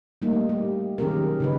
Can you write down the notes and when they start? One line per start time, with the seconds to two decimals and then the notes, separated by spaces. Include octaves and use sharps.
0.22 G3 A3 A#3 D#4
0.49 G4
0.98 D#3 F#3 C#4 G4 G#4 A#4
1.40 C#3 D#4 B4